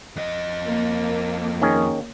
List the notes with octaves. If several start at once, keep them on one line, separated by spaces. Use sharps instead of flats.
F2 D#5
A#3
D#3 C#4 G#4